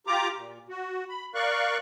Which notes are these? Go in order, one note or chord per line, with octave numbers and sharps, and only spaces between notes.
F4 G4 A#5 D6
A#2
F#4
B5
A#4 D5 F5 C#6 F#6